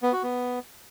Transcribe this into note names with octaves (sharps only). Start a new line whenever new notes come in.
B3
F#4
B3